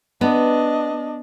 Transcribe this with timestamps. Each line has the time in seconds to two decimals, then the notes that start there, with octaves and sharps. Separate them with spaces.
0.21 B3 D4 D#5